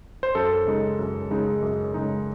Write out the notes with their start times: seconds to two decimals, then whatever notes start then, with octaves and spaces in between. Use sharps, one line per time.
0.23 C5
0.35 F#2 A4
0.67 C#3 G#3 D#4
0.99 F#2
1.31 C#3 G#3 D#4
1.62 F#2
1.94 C#3 G#3 D#4